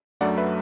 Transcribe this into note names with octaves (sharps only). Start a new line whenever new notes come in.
F#2 F#3 A3 D4 D5 F#5
B4 E5